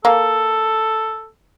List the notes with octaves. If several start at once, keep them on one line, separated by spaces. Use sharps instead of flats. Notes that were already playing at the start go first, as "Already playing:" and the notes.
A#3 A4